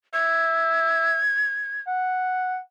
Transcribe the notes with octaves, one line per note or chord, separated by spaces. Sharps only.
E5 G#6
F#5